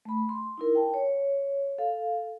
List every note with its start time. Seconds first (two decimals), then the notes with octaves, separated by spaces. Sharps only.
0.05 A3 B5
0.29 C6
0.58 D#4 E4 A#4
0.75 G5 A5
0.94 C#5
1.78 A4 F5